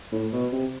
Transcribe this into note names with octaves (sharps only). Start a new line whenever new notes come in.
A2
B2
C3